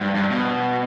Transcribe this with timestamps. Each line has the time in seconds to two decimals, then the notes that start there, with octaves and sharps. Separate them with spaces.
0.01 G2
0.15 G2
0.31 B2